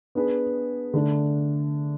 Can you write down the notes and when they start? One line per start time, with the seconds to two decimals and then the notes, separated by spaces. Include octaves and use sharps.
0.15 B3 D4 G#4 B4
0.94 D3 A3 D4